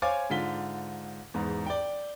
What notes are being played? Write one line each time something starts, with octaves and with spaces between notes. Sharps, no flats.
C5 C#5 F5 G#5 D6 A6
G#2 D3 F4 B6 G7
E2 G#2
D5 G5